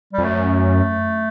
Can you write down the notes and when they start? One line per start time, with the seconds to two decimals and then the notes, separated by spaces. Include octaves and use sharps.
0.13 G3
0.18 F2
0.24 F#2 A3